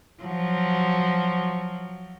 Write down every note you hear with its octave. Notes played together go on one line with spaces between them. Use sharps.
F3 F#3 F#4